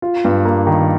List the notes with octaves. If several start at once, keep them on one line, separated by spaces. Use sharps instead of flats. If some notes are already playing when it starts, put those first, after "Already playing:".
F4
G2
A#3
D#3